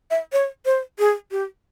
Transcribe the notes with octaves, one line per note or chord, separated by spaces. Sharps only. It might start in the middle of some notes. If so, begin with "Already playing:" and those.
E5
C#5
C5
G#4
G4